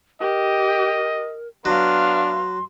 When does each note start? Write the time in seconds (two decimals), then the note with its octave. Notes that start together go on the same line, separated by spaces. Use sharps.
0.21 G4 A#4 D#5
1.65 F#3 B3 D4 F5 C6